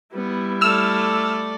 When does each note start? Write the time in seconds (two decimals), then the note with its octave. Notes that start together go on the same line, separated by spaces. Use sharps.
0.14 G3 B3 E4
0.61 A3 D5 E6 F6